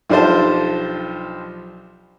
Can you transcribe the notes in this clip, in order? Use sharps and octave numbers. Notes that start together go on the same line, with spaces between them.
B1 F3 D4 G4 C5 A5